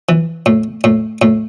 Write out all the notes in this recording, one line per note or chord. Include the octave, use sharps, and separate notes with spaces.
E3
A2
A2
A2